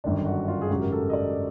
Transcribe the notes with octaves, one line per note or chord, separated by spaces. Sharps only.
G1 F#2 D#3 D4
F#4
F4
G#4
G#1 F#2 C#3 F#3 G4
A#4
A4
D#5
D5